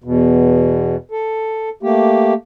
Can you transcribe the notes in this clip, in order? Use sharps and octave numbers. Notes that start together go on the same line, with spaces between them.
E2 B2
A4
A3 A#3 G4